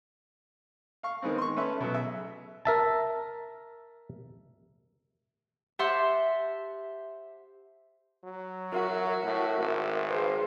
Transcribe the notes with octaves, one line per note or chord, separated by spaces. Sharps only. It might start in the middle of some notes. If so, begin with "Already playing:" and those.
F5 C#6
D#3 G#3 B3 C4
C6 C#6
A3 C#4 B4 E5
B2 F#3
G#4 E5
A#4 E5 A5
G4 C5 E5 F#5 A5 C6
F#3
F#4 A#4 E5
A2
G#1
G#4 B4 C5 F5